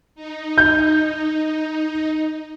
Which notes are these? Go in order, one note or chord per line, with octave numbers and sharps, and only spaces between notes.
D#4
G6